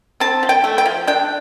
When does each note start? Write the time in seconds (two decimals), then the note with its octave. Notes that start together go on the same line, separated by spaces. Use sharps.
0.20 C4 A5
0.43 F3
0.49 G5
0.64 A3
0.78 G5
0.86 F3
1.07 D4 G5